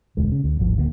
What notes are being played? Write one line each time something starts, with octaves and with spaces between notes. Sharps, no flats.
E1 D2 G#3
C#3
D2
D1 G#1 F3
D1 D3 G3 A#3